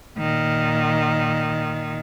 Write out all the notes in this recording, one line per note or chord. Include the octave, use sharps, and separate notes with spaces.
A#2 D#3